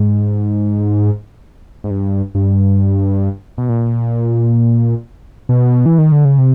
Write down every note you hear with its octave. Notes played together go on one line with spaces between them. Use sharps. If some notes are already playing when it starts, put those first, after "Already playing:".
Already playing: G#2
G#2
G2
G2
B2
A#2
B2
E3
D#3
D3
C#3
C3